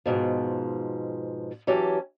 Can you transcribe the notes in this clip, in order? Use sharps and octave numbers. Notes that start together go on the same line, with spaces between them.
G#2 B2 F3
E3 F#3 C#4 G4 A5